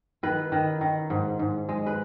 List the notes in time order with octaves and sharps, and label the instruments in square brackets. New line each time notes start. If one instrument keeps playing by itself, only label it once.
[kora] D#3 B4
D#3
D#3
G#2
G#2
G#3
B4